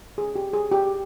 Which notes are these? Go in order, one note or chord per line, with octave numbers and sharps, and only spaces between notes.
G#4
G4
G#4
G4